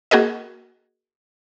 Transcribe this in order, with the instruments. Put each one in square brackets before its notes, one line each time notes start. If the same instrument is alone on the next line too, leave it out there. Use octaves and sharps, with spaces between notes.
[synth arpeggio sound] A#3 F#4 G#4 A#4 D#5